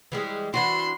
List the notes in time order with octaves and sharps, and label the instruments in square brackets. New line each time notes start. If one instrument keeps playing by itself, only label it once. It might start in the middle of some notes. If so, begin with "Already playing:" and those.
[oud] E3 G3 G#3
[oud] E3 D4 F#4 [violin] B5 C6